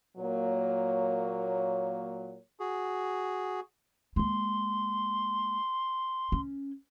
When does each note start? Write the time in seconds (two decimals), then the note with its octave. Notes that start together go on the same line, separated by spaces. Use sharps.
0.16 A#2 F#3 A#3 C#5
2.59 F#4 G#4
4.16 G#3 A#3 C6
6.32 C#4